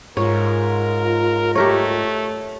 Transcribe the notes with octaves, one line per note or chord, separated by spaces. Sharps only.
G#2 F4 A#4 C#5
A3 G4 A#4 C#5